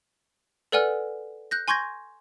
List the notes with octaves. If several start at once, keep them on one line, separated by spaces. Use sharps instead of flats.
A4 B4 D5 F#5 G#5 F6
F#6 G6 A#6
G#5 C6 C#6 G6 G#6 A#6